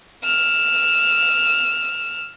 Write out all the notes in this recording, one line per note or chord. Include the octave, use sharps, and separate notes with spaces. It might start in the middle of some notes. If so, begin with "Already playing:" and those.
E6 F6